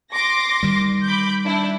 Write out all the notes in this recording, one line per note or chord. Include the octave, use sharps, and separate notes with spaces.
C6 D6 A#6
D#3 G3
B5 D6 G6
D4 E4